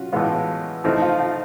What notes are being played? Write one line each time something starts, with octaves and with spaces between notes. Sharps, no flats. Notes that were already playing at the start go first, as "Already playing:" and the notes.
Already playing: C#4 F4 F#4
A2 E3 G#3 B3 F4
F3 A3 C4 D#4 E4
F4
F4